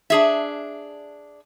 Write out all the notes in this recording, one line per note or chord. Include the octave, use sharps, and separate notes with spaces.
D4 G#4 E5